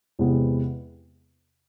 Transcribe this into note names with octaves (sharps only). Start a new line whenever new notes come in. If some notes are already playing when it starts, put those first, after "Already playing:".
E2 C3 E3 G#3 B3